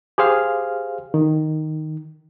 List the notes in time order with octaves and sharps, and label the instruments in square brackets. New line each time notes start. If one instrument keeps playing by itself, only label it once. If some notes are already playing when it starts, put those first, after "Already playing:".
[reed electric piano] G4 G#4 C5 F5 F6
D#3